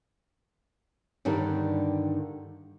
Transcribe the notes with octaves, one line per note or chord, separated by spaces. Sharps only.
G2 D3 D#3 G3 D4